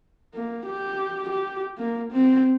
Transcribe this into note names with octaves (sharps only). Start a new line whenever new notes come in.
A#3
G4
G4
A#3
C4